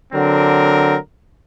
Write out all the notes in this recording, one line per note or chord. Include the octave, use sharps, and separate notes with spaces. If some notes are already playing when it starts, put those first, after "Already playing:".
D3 F#3 C4 A#4